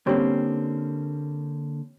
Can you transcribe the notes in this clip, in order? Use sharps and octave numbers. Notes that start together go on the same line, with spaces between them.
D3 G3 A#3 C4 C#4